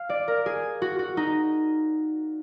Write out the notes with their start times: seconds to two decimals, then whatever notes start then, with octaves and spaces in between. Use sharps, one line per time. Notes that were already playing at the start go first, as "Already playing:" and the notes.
Already playing: F5
0.09 D5
0.28 A#4
0.46 G#4
0.82 F#4
0.99 F#4
1.17 D#4